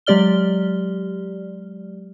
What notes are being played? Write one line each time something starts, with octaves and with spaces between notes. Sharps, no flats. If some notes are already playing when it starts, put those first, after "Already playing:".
F#3 G#3 G4 D5 F6 G7